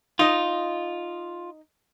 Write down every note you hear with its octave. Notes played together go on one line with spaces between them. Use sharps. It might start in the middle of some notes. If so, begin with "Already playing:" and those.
D#4 F4 D#5